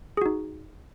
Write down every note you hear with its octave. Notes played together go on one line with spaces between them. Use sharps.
D#4 F#4 G#4